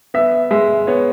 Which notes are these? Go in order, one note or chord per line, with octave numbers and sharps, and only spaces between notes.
B3 E5
G#3 E5
B3 C#5